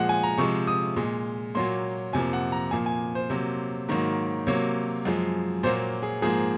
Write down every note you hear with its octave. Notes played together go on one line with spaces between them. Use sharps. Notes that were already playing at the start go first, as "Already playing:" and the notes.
Already playing: A#2 F3 G#3 F#5
G#5
A#5
C3 F3 G#3 C#6
D#6
A#2 G#3
A#2 F#3 A#3 C6
F2 C3 F3 A#3 G#5
F#5
A#5
A#2 F3 A#3 G#5
G#5
C5
C3 F#3 A#3
G#2 D#3 F#3 A#3
C3 F#3 A#3 C#5
F#2 F3 G#3
A#2 F#3 A#3 C5
G#4
G#2 F3 A#3 G#4